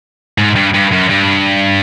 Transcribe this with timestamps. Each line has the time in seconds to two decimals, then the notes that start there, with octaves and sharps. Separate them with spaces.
0.38 G#2
0.56 G2
0.74 G2
0.92 F#2
1.10 G2